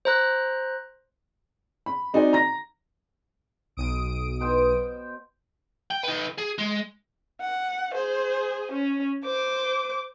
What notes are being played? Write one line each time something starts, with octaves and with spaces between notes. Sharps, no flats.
C5 A#5 F#6
B5
C4 D#4 F#4 D5 G#5
A#5 A#6
B1 D#6 D7
B2 C5 G5
G5
D#4 B4
G#4
G#3
F#5
G#4 C5
C#4
C5 D6